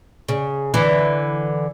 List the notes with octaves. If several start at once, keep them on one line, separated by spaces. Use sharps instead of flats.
C#3
D3 E3